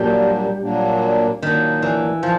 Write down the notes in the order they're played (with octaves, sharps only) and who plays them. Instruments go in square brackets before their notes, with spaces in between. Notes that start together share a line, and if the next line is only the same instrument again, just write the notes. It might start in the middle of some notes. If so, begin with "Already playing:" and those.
Already playing: [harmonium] A#2 F#3 A#3 D4 [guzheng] G3
[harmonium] A#2 F#3 A#3 D4
[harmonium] A#2 F#3 A#3 D4 [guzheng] D#3
[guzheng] E3
[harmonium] A#2 [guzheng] F3